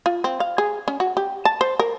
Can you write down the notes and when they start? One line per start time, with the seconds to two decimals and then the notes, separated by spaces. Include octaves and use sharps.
0.06 F4
0.24 C4
0.40 F5
0.58 G#4
0.88 C#4
1.00 F#4
1.17 G4
1.45 A5
1.61 C5
1.79 A#4